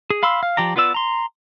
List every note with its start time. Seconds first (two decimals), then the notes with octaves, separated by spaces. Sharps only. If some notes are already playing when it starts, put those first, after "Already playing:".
0.10 G#4
0.23 F5 B5 C6 E6
0.43 F5
0.57 F3 G4 D5 A#5
0.76 B3 F4 B4 D5 E6
0.94 A#5 C6